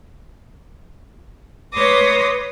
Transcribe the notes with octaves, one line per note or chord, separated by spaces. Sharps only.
B4 C#5 C6 D6 D#6 A#6